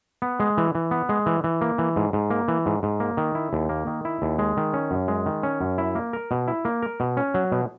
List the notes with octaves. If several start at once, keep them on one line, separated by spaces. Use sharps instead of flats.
B3
G#3
E3
E3
B3
G#3
E3
E3
A#3
E3
G#2
G#2
A#3
E3
G#2
G#2
A#3
D#3
E4
D#2
A#3
D#3
E4
D#2
G#3
D#3
C#4
F#2
G#3
D#3
C#4
F#2
E4
A#3
A#4
B2
E4
A#3
A#4
B2
C#4
F#3
B2